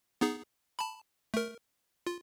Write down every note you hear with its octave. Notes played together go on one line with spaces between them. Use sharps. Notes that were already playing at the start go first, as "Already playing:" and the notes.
B3 D#4 G#4
A5 B5
A3 A#4
F4